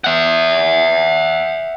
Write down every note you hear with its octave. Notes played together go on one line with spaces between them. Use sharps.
E5 F#5